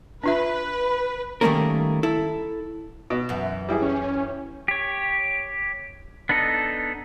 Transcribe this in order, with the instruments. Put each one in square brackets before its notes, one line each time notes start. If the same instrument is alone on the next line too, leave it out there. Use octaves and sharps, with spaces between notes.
[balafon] D4 F4 E5 [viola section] B4
[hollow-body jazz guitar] D#3 G3 A3 A#3 C#4 A#4
E4 A4
[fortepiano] B2
[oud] F#2 E3
[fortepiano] G3 E4 G#4
[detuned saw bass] C#4
[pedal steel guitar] G4 C#5
B3 D4 D#4 A4 D#5